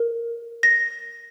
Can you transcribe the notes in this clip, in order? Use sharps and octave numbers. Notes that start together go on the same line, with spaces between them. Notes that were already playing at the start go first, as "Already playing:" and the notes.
Already playing: A#4
A#6